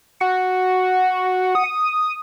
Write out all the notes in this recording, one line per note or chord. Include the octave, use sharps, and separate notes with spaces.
F#4 F#5
D#6